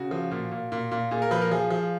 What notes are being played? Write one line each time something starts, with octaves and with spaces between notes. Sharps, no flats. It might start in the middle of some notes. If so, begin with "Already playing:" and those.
Already playing: C#3 F#4
F3
A#2
A#2
A#2
A#2
A#2 G#4
A#4
F3 B4
A#4
F3 G#4
F3